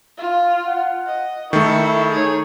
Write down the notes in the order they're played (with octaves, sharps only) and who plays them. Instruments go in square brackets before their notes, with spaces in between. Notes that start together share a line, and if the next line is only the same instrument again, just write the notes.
[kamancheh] F4
[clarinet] F#5
[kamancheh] D#5
[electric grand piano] D#3 A3 [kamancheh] E4 [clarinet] C#6
[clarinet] D#4 [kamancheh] G#4 C#5